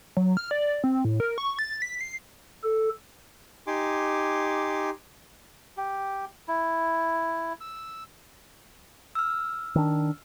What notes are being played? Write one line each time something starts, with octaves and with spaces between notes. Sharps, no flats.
F#3
F6
D5
C4
A2
A#4
C#6
A6
B6
C7
A4
D#4 G4 G#5 C6 D6
G4
E4
E6
E6 F6
D#3 D4